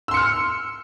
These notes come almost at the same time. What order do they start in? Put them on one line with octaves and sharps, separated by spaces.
E6 C6 C#7 F6